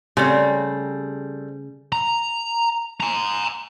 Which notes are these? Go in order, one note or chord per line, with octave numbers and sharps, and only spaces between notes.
C#3 G3 A3 C4
A#5
G#5 A#5